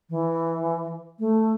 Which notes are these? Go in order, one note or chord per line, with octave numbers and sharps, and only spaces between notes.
E3
A3